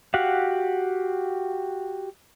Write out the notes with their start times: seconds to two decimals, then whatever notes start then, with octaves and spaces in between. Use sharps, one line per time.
0.14 F#4 G4 F5 F#5